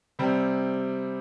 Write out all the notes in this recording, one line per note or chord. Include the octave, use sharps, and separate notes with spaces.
C3 G3 C4